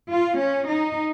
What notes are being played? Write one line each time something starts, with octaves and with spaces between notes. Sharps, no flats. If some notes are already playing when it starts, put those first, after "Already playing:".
F4
C#4
D#4